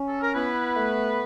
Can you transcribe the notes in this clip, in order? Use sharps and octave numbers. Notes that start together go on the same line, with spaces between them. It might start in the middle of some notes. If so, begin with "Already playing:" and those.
Already playing: C#4
A4
A#4
B3 E4 B4
A3